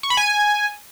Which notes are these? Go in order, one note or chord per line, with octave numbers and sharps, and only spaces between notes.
C#6
B5
G#5